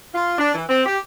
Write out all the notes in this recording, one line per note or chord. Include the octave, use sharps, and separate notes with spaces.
F4
D4
E3
C4
G4